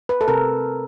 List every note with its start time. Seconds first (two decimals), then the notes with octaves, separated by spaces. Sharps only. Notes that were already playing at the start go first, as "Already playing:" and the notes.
0.09 B4
0.21 A4
0.28 C3 A#4